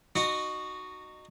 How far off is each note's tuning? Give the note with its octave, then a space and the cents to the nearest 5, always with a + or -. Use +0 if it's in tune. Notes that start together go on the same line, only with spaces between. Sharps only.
D#4 -25 F#4 +0